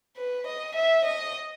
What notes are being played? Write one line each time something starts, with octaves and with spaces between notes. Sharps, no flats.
B4
D#5
E5
D#5